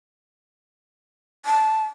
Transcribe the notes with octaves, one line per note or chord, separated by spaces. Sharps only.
A5